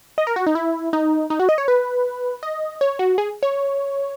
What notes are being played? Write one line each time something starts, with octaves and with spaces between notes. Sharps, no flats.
D#5
A#4
F#4
D#4
E4
D#4
D#4
F#4
D#5
C#5
B4
D#5
C#5
F#4
G#4
C#5